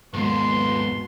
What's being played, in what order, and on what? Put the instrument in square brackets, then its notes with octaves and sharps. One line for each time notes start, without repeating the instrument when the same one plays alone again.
[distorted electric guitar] D#2 G#2 [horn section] B2 B3 C6